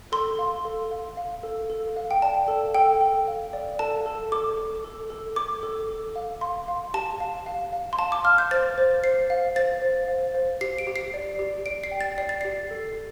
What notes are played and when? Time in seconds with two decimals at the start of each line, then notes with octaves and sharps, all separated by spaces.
0.12 A4 C6
0.39 F5
0.65 A4
0.91 F5
1.17 F5
1.43 A4
1.70 A4
1.96 F5
2.11 G5
2.22 D5 A5
2.48 A4
2.74 A4 G5
3.01 A4
3.28 F5
3.53 D5
3.79 A4 A5
4.06 A4
4.32 A4 D6
4.58 A4
4.84 A4
5.10 A4
5.36 A4 D6
5.63 A4
5.89 A4
6.16 F5
6.41 F5 C6
6.68 F5
6.94 G4 A5
7.20 F5
7.46 F5
7.73 F5
7.93 C6
7.99 F5 A5
8.12 D6
8.25 F5 F6
8.38 G6
8.51 C5 A6
8.78 C5
9.04 C5 C7
9.30 F5
9.56 C5 A6
9.82 C5
10.08 F5
10.34 C5
10.61 G4 C7
10.78 D7
10.87 G4
10.96 C7
11.14 D5
11.39 G4
11.66 D5 D7
11.84 C7
11.91 G5
12.01 A6
12.18 D5 C7
12.29 A6
12.41 G4 C7
12.71 A4